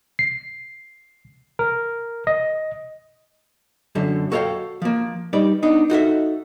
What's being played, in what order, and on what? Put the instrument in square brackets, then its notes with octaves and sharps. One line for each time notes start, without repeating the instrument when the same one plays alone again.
[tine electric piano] C7
A#4
D#5
[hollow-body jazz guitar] F#2 D3 A4
F#4 A4 C#5 D5 F5 G5
F3 A#3
G3 D#4 B4 D5
B3 D4 D#4
D#4 F#4 A4 E5